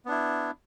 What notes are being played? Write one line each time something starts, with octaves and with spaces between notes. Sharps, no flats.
B3 D4 E4